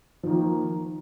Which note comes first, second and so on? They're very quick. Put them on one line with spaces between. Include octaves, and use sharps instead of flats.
F3 D#3 A#3